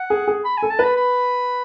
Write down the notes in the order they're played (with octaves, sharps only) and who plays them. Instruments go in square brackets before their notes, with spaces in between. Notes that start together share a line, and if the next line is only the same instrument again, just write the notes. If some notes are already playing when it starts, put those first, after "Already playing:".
Already playing: [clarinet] F#5
[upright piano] G#4
G#4
[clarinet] B5
G#5
[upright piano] A4
[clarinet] A5
[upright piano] B4 [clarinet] B5
[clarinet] B5